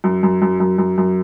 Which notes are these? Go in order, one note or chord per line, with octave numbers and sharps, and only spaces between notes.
F#2
F#2
F#2
F#2
F#2
F#2